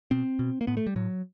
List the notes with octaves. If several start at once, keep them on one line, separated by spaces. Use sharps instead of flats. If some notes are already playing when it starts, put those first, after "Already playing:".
B2 C4
B2
A#3
A2 B3
A3
G3
A2 F#3